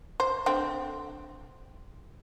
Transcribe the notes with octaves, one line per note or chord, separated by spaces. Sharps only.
C5
D3 C4